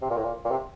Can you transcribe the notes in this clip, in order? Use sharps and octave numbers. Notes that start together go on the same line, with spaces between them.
C3
A#2
A2
A#2
A#2
C3